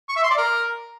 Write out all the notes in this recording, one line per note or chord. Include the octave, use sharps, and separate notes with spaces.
C#6
E5
C6
D5
A#4